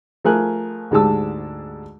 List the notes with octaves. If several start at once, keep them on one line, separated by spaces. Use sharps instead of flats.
F3 A3 G#4 A#4 G#5 F#6
D2 G#2 G#3 G4 A5 E6